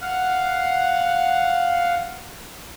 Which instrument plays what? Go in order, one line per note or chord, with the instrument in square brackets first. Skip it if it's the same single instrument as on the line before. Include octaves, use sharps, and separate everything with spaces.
[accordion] F5 F#5